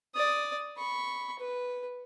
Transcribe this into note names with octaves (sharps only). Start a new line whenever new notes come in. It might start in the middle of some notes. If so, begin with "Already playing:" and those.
D5 D#6
B5 C#6
B4